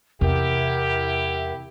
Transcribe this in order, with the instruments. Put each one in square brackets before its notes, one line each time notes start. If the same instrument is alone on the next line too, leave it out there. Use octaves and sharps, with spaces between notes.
[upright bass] E2 [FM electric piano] C3 [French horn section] E4 G4 [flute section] A#4 E5 F#5